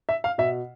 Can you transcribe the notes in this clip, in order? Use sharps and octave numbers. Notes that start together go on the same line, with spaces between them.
E5
F5
B2 E5